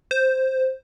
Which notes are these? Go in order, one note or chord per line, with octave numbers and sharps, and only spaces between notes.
C5